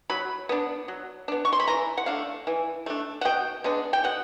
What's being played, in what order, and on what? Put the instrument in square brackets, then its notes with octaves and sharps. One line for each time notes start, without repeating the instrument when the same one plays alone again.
[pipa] F#3 B5
B3 D4
F#3
B3 D4
C#6
C6
B5
E3 A#5
F#5
A3 D4 F5
E3
A3 D4
F#5
B2 G5
G#3 B3 D4
G5
B2 F#5